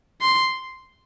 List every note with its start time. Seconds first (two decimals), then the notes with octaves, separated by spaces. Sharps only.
0.21 C6